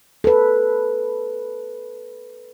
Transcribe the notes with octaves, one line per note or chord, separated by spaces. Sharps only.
A4 B4